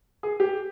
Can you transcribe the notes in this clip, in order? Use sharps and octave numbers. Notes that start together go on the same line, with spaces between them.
G#4
G4